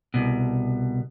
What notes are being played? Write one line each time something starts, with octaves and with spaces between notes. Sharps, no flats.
C2 B2